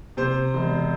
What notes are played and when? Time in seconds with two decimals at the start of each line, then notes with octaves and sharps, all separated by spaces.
0.17 C3 C5
0.54 E1